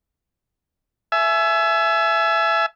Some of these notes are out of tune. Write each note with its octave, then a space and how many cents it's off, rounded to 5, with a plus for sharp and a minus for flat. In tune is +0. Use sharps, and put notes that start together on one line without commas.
E5 +15 G#5 +35